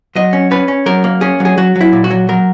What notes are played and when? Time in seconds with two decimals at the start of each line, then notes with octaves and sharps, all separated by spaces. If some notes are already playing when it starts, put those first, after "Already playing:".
0.15 F#3 D#5
0.33 C#4
0.51 C#4 B4
0.68 C#4
0.86 F#3 A#4
1.04 A#3
1.21 C#4 G#4
1.40 F#3 G#4
1.57 F#3 F#4
1.76 F#3
1.81 E4
1.93 A#2
2.04 F#4
2.11 F#3
2.29 F#3 A#4